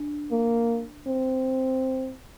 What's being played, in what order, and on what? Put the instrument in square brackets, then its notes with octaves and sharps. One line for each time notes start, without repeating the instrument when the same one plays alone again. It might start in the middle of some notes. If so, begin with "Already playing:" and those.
Already playing: [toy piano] D4
[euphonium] A#3
C4